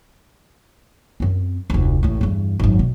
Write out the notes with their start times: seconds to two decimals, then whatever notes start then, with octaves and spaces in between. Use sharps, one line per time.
1.20 F#2 C4
1.70 F1 D2
2.03 A1 A2
2.21 E2 G2
2.59 G#1 F#2
2.79 B2